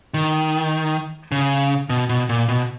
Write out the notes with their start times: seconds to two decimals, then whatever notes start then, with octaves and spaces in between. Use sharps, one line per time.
0.14 D#3
1.32 C#3
1.90 B2
2.09 B2
2.29 A#2
2.48 B2